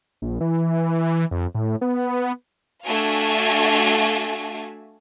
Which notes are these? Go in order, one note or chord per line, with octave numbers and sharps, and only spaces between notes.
A#1
E3
F2
A2
B3
A3 D4 F#4 E5 F5 G#5